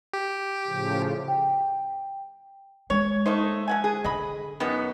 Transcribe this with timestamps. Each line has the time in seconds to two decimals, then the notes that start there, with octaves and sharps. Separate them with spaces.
0.13 G4
0.68 A2 C#3 F3
1.28 G5
2.90 G#3 C#5
3.26 A3 A#3 D#4 C5
3.68 F3 F#5 G#5
3.84 G#4
4.04 D3 D#5 B5
4.60 F#2 D#3 B3